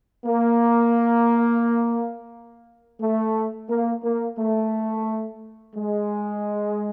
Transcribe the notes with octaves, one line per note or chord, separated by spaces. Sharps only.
A#3
A3
A#3
A#3
A3
G#3